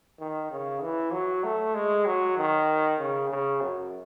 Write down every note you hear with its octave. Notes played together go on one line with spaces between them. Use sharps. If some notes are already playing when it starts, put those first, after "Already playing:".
D#3
C#3
E3
F#3
A3
G#3
F#3
D#3
C#3
C#3
F#2